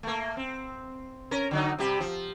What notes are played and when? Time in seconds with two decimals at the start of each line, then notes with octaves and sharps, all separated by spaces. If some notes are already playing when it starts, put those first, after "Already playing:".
0.03 A3 A#3
0.37 C4
1.31 C#4 A#4
1.51 D3 F#3 D#4
1.79 C3 G3 G4
2.00 F3